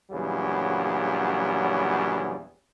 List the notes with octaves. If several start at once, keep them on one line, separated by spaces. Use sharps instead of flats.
A#1 E2 C#3 F#3 G3